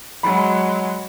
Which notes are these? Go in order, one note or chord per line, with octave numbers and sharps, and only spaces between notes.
F#3 G#3 B5